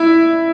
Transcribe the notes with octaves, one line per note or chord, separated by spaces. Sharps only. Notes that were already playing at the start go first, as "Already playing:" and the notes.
Already playing: E4